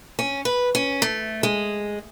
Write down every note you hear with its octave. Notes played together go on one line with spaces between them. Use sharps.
C#4
B4
C#4
A3
G#3